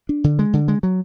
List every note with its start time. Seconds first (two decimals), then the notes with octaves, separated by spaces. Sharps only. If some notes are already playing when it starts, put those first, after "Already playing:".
0.09 D4
0.24 D3
0.39 G#3
0.53 D3
0.68 G#3
0.83 F#3